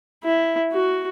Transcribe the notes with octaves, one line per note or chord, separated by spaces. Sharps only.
E4
F#4